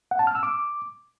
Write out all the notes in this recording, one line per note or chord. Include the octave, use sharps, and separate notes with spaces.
F#5
A5
F6
E6
D6